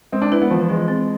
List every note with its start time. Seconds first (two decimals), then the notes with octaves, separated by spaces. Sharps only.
0.12 G#3 C4
0.22 D4
0.32 E4 B4
0.42 B3
0.51 E3 F3
0.69 E3 G#3
0.88 C4